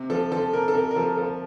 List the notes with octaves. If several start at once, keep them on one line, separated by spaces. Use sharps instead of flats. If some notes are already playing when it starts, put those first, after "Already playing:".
Already playing: C3
F3 A4
F3 A4
C3 A#4
A4
C3 A#4
A#4
F3 A4
F3 A4